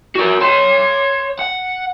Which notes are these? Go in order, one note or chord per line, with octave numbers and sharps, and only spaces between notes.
F#4 A#4
C#5 C6
F#5